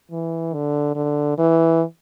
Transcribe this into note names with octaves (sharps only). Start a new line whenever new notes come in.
E3
D3
D3
E3